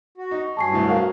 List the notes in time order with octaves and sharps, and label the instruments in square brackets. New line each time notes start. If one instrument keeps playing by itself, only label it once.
[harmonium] F#4
[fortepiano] D#4
[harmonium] G2 F#3 G#4 [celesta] A5 C#6 C7
[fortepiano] C2 A2
[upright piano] F#4 A#4 F5